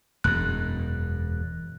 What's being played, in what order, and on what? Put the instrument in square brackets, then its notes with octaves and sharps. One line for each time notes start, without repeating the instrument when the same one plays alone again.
[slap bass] E1 F#2 [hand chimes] F#6